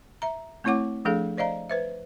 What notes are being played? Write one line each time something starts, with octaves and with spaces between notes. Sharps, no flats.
E5 A#5
A3 C4 E4 C#5 F#5 D6
F3 A3 D4 G#4 A4 F5
C5 D5 D#5 F5 A#5
B4 C5 E5